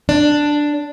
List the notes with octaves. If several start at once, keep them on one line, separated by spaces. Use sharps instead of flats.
D4